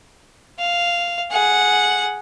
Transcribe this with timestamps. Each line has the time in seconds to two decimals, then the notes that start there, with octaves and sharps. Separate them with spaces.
0.59 F5
1.31 G#4 F#5